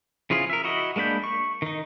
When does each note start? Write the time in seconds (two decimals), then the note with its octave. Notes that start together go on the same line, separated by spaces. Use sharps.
0.30 C#3 F3 E4 F4 G#4
0.50 A#4 E5
0.64 E4 F#4 D#5
0.96 G#3 A#3 D4 B5 G6
1.24 C#6
1.62 D#3 D#4